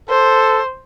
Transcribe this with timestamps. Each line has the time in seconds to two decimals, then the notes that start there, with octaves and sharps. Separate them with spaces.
0.09 A4 C5